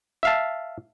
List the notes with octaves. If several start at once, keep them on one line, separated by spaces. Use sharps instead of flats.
E5 F5 A5